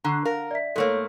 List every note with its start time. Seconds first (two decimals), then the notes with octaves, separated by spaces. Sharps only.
0.04 D3 A#5 C#6 C7
0.25 A#4 F5
0.51 D5 E5 B6
0.76 G#2 A3 A#3 A4 C#5